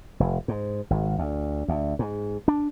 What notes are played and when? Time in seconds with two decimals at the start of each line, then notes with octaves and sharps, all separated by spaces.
0.20 F1
0.48 G#2
0.90 G#1
1.19 D2
1.68 D2
1.99 G#2
2.48 D4